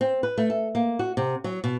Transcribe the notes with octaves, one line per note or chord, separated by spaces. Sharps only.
C4
B4
A3
A4
A#3
F#4
C3
F#3
B2